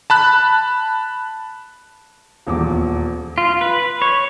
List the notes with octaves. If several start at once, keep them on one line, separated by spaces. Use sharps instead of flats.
A5 B5 F#6
D#1 E2 D6
F4
B4
C#5